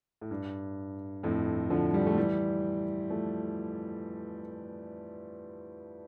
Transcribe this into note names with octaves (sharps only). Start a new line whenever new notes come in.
A2
G2
F2 A2
D3 F3
G3
A3
E3 G3
F3 A3